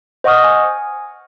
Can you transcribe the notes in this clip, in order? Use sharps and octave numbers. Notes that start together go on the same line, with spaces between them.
C5 D#5 F#5 C#6 D#6 F6
G#5